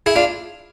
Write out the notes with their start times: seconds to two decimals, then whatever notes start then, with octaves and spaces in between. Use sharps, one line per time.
0.06 E4 G#4
0.16 D4 F4